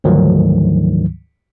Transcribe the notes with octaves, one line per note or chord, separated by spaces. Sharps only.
D2 G#2 D#3 F3 F#3